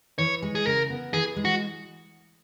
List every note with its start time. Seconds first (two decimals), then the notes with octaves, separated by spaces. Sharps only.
0.18 E3 C#5
0.42 G#3
0.55 G#4
0.66 C#3 A#4
0.90 B3
1.14 E3 G#4
1.36 G#3
1.45 F#4